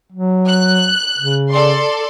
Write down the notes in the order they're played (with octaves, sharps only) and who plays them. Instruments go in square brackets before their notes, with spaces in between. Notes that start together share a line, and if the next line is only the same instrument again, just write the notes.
[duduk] F#3
[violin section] F#6
[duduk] C#3
[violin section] A4 D5 C6